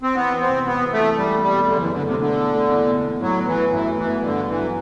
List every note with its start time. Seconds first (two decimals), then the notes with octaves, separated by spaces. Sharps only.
0.03 C4
0.15 E2 B3
0.32 E3
0.41 C4
0.49 C3
0.66 E1 B3
0.84 E2
0.92 A3
1.00 E3
1.18 E2 G3
1.35 A3
1.43 G3
1.52 B2
1.68 F#1 D3
1.81 E3
1.86 E2
1.94 D3
2.02 C3 A3
2.19 B2 D3
2.37 E2
2.54 A3
2.70 E2
2.87 B2
3.04 E2
3.21 A2 F#3
3.38 B3
3.47 E3
3.55 F#3
3.72 A1 E3
3.90 A2
3.98 E3
4.07 B3
4.23 G2 D3
4.40 B3
4.49 E3
4.58 F#3